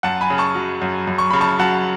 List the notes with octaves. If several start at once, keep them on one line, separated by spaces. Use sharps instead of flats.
F#2 F#5 A5
G#5 B5
C#3
A5 C#6
F#3
F#2
F#2
C#6
C#3 B5
A5 C#6
F#3 F#5 A5